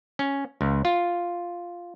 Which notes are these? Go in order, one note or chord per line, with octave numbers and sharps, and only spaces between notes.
C#4
C#2
F4